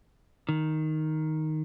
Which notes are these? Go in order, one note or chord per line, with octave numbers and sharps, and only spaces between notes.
D#3